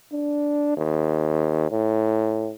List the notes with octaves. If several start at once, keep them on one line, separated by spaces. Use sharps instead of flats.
D4
D#2
A2